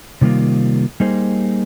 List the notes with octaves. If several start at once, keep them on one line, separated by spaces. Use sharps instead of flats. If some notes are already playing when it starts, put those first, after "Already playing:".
C3 D#3 G3 A#3 F4
G3 A#3 D#4 G#4 C5